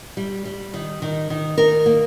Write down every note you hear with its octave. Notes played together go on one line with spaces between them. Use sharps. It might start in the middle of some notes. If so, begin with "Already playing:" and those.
G3
G3
D#3
D#3
D#3
D#3 A#4
A#3